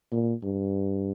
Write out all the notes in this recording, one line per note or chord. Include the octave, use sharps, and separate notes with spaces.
A#2
G2